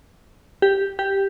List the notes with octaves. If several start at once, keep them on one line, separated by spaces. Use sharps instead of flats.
G4
G4